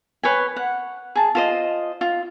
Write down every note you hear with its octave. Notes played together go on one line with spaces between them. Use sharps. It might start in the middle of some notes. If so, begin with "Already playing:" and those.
B4 C#5 G5 G#5
F#5
G#4 A5
F4 C5 D#5
F4